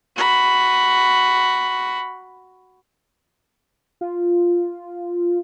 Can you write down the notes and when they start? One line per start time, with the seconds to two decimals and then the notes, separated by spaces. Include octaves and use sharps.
0.16 F#4 B5
4.01 F4